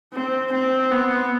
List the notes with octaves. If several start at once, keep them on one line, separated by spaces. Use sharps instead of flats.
C4
C4
B3